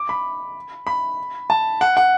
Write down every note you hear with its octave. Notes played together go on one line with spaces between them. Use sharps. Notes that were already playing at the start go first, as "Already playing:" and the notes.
Already playing: D6
B5
B5
A5
F#5
F#5